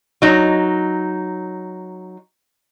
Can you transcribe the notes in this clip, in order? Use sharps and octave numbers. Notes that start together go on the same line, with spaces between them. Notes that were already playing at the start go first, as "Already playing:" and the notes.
F#3 D#4